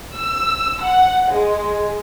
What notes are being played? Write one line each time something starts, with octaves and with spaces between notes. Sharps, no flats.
E6
F#5
G#3